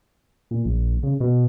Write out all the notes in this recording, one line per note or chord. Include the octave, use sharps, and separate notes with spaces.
A#2
A#1
C#3
B2